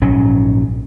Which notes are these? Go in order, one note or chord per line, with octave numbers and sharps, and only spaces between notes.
A#1 G#2 F#3 C#4